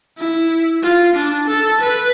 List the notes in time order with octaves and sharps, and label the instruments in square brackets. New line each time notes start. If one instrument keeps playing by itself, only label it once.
[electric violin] E4
F4
D4
A4
B4